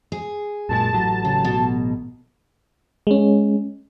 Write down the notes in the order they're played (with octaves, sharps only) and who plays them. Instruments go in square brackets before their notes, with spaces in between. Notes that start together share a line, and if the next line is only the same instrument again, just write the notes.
[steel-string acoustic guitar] G#4
[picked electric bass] F#2 A#2 G#3 [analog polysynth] A5
[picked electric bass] A1 F#3
[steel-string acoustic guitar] C#3
B2
[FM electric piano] G#3 C#4